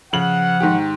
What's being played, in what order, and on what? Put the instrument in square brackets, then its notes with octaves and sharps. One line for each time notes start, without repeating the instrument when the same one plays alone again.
[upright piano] C#3 F#7 [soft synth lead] F3 [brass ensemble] F#5
[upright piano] G#2 D#3 G4